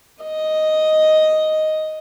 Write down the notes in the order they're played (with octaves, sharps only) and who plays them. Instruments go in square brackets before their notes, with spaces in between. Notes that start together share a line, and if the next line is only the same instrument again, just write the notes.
[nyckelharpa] D#5